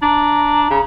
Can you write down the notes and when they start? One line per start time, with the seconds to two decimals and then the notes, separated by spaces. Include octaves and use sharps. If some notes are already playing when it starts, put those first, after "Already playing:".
0.02 D4 A#5
0.70 C#3